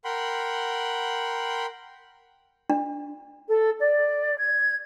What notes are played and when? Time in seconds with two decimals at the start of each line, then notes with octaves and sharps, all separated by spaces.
0.05 A#4 F#5 G5 B5 C6
2.70 D4
3.49 A4
3.80 D5
4.39 G#6